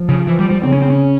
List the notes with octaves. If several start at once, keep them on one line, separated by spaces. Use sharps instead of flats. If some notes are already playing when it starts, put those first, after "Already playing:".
Already playing: F3
C#3
E3
G3
G3
C#3 C4
C#4
C4
C#4